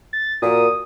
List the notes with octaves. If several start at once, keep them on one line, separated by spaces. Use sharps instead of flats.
A6
A#2 F#4 A#4 D#6